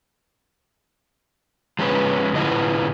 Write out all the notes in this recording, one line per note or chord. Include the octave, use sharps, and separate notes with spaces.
F3 G#3 C#4 B4
A2 D3 F3 B3 E4 D#5